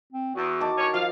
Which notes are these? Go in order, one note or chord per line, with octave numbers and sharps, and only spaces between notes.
C4
E2 F#4
D#3 A5 D6
A2 C#4 C#5
F3 F5